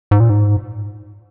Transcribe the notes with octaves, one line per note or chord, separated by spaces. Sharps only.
G#2
A#2
G#2